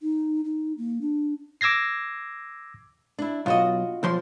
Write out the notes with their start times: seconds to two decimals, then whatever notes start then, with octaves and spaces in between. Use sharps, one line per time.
0.01 D#4
0.44 D#4
0.78 A#3
1.01 D4
1.61 D6 E6 G#6 A#6 C7
3.19 D4 E4
3.46 B1 F4 F#4 D#5
4.03 B1 F3 C6